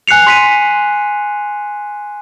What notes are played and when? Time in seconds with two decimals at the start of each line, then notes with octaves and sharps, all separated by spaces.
0.08 G#5 F#6 C7 C#7 F7
0.27 C6 B6 D#7